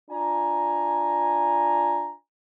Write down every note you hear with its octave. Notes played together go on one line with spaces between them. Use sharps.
D4 F4 G#5 A#5